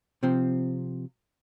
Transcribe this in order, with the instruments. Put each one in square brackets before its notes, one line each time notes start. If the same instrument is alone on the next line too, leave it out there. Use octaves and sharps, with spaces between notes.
[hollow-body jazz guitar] C3 F3 C4